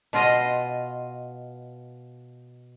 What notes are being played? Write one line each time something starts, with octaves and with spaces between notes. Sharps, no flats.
B2 F4 D#5